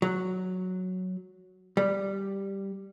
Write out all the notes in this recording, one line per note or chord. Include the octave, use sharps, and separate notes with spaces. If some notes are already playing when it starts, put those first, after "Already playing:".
F#3
G3